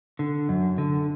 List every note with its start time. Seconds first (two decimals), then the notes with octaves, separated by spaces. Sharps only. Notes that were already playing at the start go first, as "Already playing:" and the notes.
0.19 D3
0.49 F#2
0.78 D3